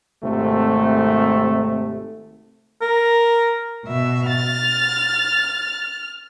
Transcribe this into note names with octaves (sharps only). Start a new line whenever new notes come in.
G#1 C3 A3
A#4
B2 E5
F6 A6